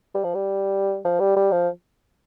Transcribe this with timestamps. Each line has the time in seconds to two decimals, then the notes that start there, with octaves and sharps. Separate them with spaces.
0.15 G3
0.24 F3
0.35 G3
1.05 F3
1.20 G3
1.36 G3
1.51 F3